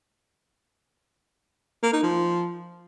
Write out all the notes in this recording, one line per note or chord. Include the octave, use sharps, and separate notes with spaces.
A#3
D#4
F3